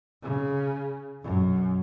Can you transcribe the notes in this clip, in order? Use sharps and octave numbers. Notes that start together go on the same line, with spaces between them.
C#3
B1 F#2